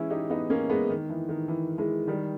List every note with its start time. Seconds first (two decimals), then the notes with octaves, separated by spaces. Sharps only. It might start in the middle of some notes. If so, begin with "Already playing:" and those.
Already playing: E3 G#3 C#4 E4
0.10 D#4 G4
0.30 B3 D#4
0.50 A#3 C#4
0.70 G#3 B3
0.90 D#3
1.10 E3
1.29 D#3
1.48 E3
1.78 E3 G#3
2.07 D#3 G3